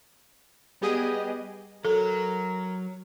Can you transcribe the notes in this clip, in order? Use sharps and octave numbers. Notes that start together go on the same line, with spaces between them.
G3 B3 G4 G#4 D#5
F#3 A4 A#4